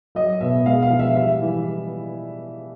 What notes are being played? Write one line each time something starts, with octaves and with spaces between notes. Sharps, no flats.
F#3 D#5
B2 E5
G#3 F5
F5
F3
E5
G3 E5
E3